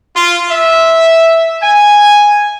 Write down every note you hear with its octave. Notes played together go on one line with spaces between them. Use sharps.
F4
E5
G#5